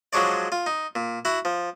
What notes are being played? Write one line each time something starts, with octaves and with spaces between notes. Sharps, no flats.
F3 F#3 G#3 D4 C#5 D5
F4
D#4
A#2
E4 F#4 F#5
F3